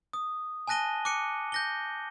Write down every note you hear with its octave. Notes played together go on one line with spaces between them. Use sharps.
D#6
G#5 A5 F#6 A#6 D#7 G7
D6 F#6 C#7 D#7
G6 A#6 G7